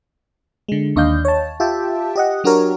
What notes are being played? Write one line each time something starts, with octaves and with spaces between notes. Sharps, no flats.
D3 G#3
D#2 D4 D#5 F5 G6
C#5 A5
F4 G4 E5 G5 A5
G4 D#5 F#5
F#3 D4 F#4 G4 A#4 C#5